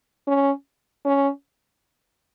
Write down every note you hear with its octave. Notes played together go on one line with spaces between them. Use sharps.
C#4
C#4